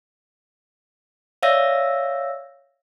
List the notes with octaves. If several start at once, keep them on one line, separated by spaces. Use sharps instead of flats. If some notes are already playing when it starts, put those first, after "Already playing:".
C#5 D5 E5 F5 E6 A#6